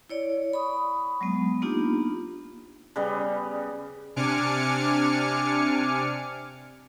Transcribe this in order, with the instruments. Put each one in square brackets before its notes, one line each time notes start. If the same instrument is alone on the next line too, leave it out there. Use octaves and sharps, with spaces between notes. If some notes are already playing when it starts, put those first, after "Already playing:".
[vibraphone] E4 C#5 D5
B5 C#6 D#6
F#3 G#3 B3
A#3 B3 D4 D#4 F4 G4
[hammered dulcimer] C#3 G3 B3
[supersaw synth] C3 D4 G#5 D6 F6 C#7